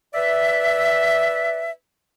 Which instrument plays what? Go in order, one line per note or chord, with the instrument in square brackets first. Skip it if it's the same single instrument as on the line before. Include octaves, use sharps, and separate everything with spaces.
[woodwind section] B4 D5 E5